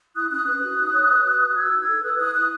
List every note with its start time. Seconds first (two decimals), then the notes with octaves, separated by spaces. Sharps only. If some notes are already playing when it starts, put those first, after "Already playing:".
0.15 E4 D#6 F#6
0.30 C#4 D#6 F#6
0.46 B4 D#6 F#6
0.62 F#4
0.78 D#4
0.93 C#5
1.09 B4
1.24 F#4
1.40 F#4
1.56 F#4 E6 G#6
1.72 D#4
1.79 E6 G#6
1.87 A4
2.03 B4 D#6 F#6
2.19 E4 D#6 F#6
2.35 E4 D#6 F#6